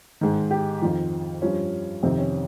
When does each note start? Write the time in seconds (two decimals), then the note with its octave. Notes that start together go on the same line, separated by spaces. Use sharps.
0.21 G#2 D#3
0.51 G4
0.82 F2 D#3 F4
1.42 G2 F3 C#4
2.03 F2 C3 D#3 C4
2.18 C#4